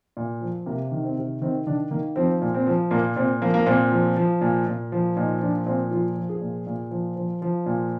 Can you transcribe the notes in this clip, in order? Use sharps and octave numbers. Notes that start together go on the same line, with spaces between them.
A#2
F3
C3 A#3
D#3
C4
C3
D#3 C4
D#3 D4
D#3 A#3
F3 C4
A#2
C4
F3
A#2 A#3
A#2 C4
F3 A#3
A#3
A#2 C4
F3
F3
A#2
A#2
F3
A#2 D#4
F3 D4
A#2 C4
F3 F4
F3
G#4
A#2
A#2
F3
F3
F3
A#2